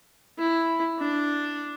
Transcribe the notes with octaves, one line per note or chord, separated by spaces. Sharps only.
E4
D4